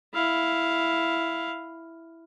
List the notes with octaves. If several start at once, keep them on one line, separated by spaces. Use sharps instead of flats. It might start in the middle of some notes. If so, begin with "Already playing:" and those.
E4 F5